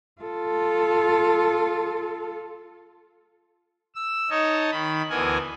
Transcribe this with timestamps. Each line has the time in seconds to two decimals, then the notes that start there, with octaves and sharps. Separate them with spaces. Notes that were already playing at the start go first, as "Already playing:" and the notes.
0.21 F4 A4
3.95 E6
4.30 D#4 C#5 D#5 A5
4.71 D#3 B5
5.10 D2 E3 B3 A#4 G#5